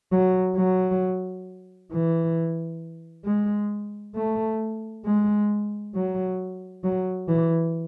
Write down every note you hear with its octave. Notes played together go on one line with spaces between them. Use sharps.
F#3
F#3
E3
G#3
A3
G#3
F#3
F#3
E3